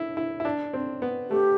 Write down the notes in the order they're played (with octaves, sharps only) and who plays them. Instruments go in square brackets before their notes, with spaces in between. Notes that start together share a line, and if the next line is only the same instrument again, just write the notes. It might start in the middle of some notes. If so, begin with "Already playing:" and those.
Already playing: [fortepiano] E4
E4
E4
D4
C4
B3
[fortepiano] A3 [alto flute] G4